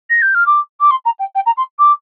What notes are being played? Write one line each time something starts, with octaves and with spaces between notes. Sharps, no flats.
A#6
G6
F6
D6
D6
C6
A#5
G5
G5
A#5
C6
D6